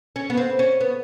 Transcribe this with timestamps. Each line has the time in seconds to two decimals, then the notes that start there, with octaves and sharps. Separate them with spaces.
0.16 C#4
0.30 B3
0.37 C4
0.59 C#4
0.81 B3